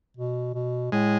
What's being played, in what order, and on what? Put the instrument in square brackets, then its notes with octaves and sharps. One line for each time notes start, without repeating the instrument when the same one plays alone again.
[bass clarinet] B2
B2
[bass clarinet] A2 [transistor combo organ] G#3